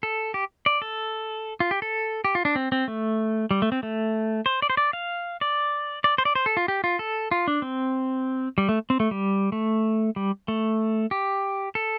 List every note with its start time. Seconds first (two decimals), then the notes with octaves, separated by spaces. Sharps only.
0.03 A4
0.34 G4
0.66 D5
0.82 A4
1.60 F4
1.71 G4
1.82 A4
2.25 G4
2.35 F4
2.45 D4
2.56 C4
2.72 C4
2.88 A3
3.51 G3
3.62 A3
3.72 C4
3.83 A3
4.46 C5
4.62 D5
4.70 C5
4.77 D5
4.93 F5
5.41 D5
6.04 D5
6.18 C5
6.25 D5
6.35 C5
6.46 A4
6.57 F4
6.68 G4
6.84 F4
6.99 A4
7.31 F4
7.48 D4
7.62 C4
8.58 G3
8.69 A3
8.90 C4
9.00 A3
9.11 G3
9.52 A3
10.16 G3
10.48 A3
11.11 G4
11.75 A4